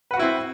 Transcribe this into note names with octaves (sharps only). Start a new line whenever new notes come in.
C4 E4 F#4 B4 F#5